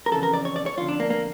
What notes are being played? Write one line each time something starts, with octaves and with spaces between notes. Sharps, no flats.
A#4
F2 C#3 E3 A4
A#4
D5
C#5
D5
C#5
F2 D3 F4
D4
A#3
A#3